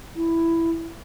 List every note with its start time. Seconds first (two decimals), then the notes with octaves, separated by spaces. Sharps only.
0.16 E4